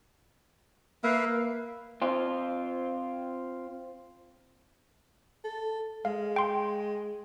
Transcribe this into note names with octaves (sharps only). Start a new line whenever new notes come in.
A#3 B4 E5 F5
C4 F4
A4
G#3 F5
G5 C6